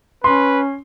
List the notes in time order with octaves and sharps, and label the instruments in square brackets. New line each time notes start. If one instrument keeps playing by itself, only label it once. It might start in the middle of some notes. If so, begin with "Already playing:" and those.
[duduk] C#4 [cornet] B4 [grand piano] C6